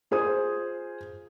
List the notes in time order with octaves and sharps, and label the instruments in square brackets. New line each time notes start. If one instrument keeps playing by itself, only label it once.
[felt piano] F4 G#4 C5 D#6